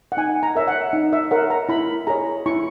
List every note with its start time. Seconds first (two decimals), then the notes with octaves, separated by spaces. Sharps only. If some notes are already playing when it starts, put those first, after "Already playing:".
0.12 F#5
0.17 D#4 G#5
0.43 A#5
0.55 A#4 C#5 E5
0.68 F#5
0.93 D#4
1.13 E5
1.31 A#4 C#5 F#5
1.50 A#5
1.69 E4 B5
2.07 G#4 C#5 A#5
2.46 E4 C#6